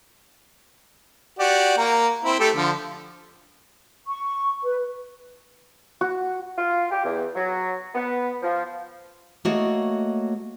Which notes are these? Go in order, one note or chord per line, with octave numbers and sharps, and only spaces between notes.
F#4 G4 D5
A#3 A#5
C4 E4
A3 G4 A4
D3 F3
C#6
B4
F#4
F4
G4
E2
F#3
B3
F3
A3 A#3 F#4 C#5 D#5